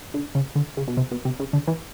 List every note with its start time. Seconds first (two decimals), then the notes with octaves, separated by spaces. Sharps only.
0.14 D3
0.35 C#3
0.55 D3
0.77 C#3
0.88 B2
0.97 C3
1.11 B2
1.25 C3
1.40 C#3
1.53 D3
1.67 E3